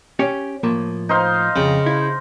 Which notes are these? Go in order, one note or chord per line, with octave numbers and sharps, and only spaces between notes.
C#4 G4 C#5
A2 F3 A#3
D#4 C5 F5
F2 C#3
E4